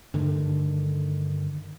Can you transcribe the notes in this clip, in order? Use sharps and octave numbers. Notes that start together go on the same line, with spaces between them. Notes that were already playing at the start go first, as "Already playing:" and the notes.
G2 D3 D#3 A3